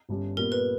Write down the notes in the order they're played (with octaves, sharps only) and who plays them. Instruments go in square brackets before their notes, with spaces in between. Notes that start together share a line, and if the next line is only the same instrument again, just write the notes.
[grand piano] G1 G2 G3 C#4
[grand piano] A#2 G3 B3 [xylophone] A#4
[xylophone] B4